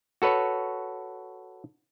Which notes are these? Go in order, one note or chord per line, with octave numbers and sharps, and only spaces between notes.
F#4 A4 B4 C#5